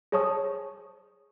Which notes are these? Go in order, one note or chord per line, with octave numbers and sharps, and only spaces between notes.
G#4 C5 C#5 A5 C#6 D#6